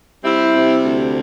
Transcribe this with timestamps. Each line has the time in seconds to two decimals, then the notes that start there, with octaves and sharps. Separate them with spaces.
0.23 G3 C4 E4
0.54 C3
0.84 D2